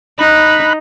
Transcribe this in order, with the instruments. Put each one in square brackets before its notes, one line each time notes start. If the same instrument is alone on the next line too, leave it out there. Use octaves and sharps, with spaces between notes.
[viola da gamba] D#4 [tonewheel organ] B5 F#6